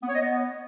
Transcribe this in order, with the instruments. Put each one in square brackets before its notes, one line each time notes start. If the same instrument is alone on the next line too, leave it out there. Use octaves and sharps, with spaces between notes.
[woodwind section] B3
C#5
D#5
B3